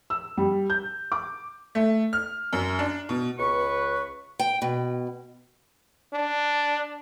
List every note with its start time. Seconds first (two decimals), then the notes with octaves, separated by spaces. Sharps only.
0.10 E6
0.37 G3
0.70 G6
1.12 D6
1.75 A3
2.13 F6
2.53 F#2
2.79 D4
3.09 B2
3.39 C#2 B4 C#6
4.39 G5
4.62 B2
6.13 D4